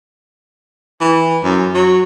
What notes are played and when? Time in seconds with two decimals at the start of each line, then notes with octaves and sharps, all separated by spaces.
1.01 E3
1.43 F#2
1.74 F#3